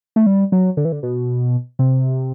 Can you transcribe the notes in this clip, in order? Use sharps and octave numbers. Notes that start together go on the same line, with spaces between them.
A3
G3
F#3
D3
E3
D3
B2
C3